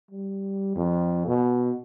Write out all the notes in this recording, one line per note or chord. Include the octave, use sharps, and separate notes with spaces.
G3
F2
B2